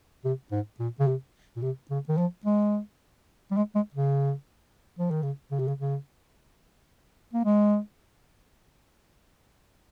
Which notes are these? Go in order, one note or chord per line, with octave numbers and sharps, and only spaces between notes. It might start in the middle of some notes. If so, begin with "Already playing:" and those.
C3
G#2
A#2
C#3
C3
A#2
C3
C#3
D#3
F3
G#3
G3
G#3
G#3
C#3
F3
D#3
C#3
C#3
C3
C#3
C#3
A#3
G#3